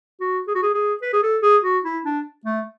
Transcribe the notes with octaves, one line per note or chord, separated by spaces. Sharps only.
F#4
G#4
F#4
G#4
G#4
B4
G#4
A4
G#4
F#4
E4
D4
A3